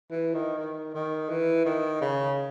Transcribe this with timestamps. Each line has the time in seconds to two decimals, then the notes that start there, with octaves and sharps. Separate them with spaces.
0.10 E3
0.34 D#3
0.59 D#3
0.94 D#3
1.29 E3
1.65 D#3
2.01 C#3